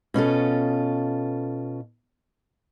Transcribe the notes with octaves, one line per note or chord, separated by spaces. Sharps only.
B2 C#4 F4 A4